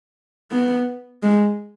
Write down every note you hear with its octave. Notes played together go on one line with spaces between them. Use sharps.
B3
G#3